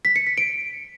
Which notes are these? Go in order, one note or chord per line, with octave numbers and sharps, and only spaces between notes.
B6
C#7
B6
D7